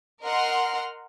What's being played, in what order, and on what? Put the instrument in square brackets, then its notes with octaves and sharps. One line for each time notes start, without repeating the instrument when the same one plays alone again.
[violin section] A#4 D#5 F#5 C6 F6